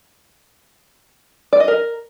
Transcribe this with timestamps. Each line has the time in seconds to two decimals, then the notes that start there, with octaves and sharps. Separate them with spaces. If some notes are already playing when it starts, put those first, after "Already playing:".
1.53 D5
1.60 D#5
1.68 A#4